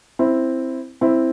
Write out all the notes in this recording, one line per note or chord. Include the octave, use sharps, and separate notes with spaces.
C4 E4
C4 E4